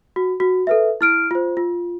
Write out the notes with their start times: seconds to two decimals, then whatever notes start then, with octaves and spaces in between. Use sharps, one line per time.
0.16 F#4
0.40 F#4
0.67 A4 B4 E5
1.01 E4 F6 D7
1.31 F4 C5
1.57 F4